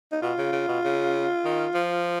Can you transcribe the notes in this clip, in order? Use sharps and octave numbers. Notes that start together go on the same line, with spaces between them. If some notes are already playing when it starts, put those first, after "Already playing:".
D#4
B2 F4
C#3
C#3
B2
C#3
D#3
F3